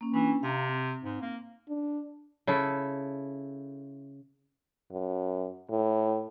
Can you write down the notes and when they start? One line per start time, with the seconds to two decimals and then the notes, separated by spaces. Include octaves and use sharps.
0.01 A#3 C#4
0.14 E3 C#4 D4 E4
0.43 C3 F5 A#5
0.69 C4
1.03 G#2
1.21 A#3
1.69 D4
2.47 C#3 E4 A4
4.91 F#2
5.70 A2